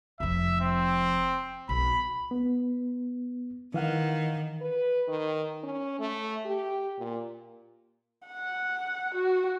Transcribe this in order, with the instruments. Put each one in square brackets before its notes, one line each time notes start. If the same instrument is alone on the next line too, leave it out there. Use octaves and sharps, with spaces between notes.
[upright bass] F1 F3 [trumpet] E5
[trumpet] C4
[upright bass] B1 [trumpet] B5
[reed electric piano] B3
[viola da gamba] D#3 [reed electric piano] E3 F5 F#5
[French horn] B4
D#3
C#4
A3
G4
A#2
[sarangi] F#5
F#4